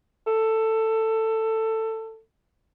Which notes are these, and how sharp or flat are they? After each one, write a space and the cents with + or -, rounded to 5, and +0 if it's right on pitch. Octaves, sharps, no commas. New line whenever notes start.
A4 +15